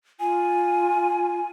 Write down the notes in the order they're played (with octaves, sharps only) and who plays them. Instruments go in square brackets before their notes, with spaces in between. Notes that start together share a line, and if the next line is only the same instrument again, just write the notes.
[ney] F4 [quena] G#5